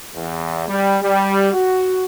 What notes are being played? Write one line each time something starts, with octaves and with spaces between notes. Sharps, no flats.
E2
G3
G3
F#4